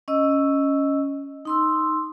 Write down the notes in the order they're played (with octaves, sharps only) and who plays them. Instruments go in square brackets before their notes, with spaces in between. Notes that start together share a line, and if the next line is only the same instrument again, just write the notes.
[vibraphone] C#4 D#5 E6
D#4 C6 E6